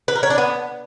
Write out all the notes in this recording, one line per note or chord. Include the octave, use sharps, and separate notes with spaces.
B4
A#4
C#5
D4
B3